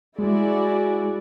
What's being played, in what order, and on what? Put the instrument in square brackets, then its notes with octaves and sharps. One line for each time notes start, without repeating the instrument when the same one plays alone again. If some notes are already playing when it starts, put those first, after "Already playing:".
[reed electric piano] G#3 [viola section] E4 F#4 D5 [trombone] G#4